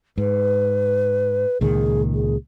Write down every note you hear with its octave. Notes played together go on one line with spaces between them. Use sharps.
G#2 B4
C#2 A#2 D#3 G#4
G#4